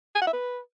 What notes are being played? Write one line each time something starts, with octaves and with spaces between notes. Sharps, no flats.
G#5
F#5
E5
B4